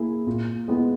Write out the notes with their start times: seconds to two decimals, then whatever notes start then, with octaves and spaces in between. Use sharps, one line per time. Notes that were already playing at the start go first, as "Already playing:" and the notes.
Already playing: A#3 E4 G#4
0.27 A#2
0.68 G#3 B3 E4